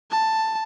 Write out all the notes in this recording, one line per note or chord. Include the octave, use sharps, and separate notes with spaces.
A5